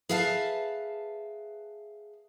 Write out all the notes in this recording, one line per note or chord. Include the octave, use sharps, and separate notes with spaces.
G#4 B4 E5 F5 G5 A5